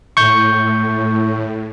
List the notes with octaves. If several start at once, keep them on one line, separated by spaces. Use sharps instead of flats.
A2 C#6 G6